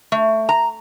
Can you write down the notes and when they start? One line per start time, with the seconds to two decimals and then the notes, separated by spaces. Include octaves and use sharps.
0.12 A3
0.49 A#5